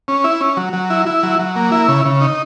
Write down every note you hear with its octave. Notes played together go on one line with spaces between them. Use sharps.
C#4
E4
C#4
F#3
F#3
E4
E4
F#3
F#3
A#3
E4
C#3
C#3
D#4